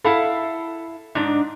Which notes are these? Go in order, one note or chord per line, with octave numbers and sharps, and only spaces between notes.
E4 A4 F5 F#5 B5
G#2 D4 D#4